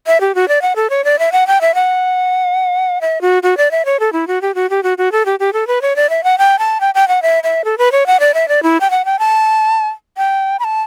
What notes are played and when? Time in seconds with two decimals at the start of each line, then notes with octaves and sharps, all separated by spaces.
0.07 E5
0.21 G4
0.35 F#4
0.48 D5
0.62 F#5
0.76 A4
0.90 C#5
1.04 D5
1.19 E5
1.32 F#5
1.47 G5
1.61 E5
1.75 F#5
3.01 E5
3.21 F#4
3.43 F#4
3.57 D5
3.71 E5
3.85 C#5
4.00 A4
4.13 E4
4.27 F#4
4.42 G4
4.55 F#4
4.70 G4
4.83 F#4
4.98 F#4
5.12 A4
5.26 G4
5.40 G4
5.53 A4
5.67 B4
5.82 C#5
5.96 D5
6.10 E5
6.24 F#5
6.38 G5
6.59 A5
6.81 G5
6.95 G5
7.08 F#5
7.22 E5
7.44 E5
7.65 A4
7.78 B4
7.92 C#5
8.07 F#5
8.20 D5
8.34 E5
8.48 D5
8.63 E4
8.81 G5
8.90 F#5
9.05 G5
9.19 A5
10.17 G5
10.59 B5
10.64 A5